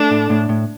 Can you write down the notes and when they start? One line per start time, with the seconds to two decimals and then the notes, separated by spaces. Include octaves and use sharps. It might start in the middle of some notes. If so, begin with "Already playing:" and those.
Already playing: A3 D4
0.11 A2
0.30 A2
0.49 A2